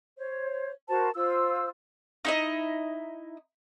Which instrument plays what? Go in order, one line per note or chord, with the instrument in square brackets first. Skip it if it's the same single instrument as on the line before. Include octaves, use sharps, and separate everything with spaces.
[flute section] C5 C#5
F#4 A#4 C5 A5
F4 C5 E6
[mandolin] D#4 E4 D#5